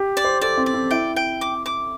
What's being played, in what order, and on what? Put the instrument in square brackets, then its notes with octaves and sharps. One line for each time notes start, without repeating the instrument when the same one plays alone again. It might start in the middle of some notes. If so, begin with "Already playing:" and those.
Already playing: [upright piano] G4
[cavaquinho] D5
[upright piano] C5
[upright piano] A4 [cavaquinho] D5
[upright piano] C4
[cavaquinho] D5
[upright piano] C4
[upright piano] E4 [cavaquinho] G5
[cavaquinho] G5
D6
D6